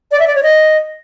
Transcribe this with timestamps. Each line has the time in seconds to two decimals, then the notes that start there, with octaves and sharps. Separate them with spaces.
0.12 D5
0.19 E5
0.27 D5
0.35 C#5
0.43 D#5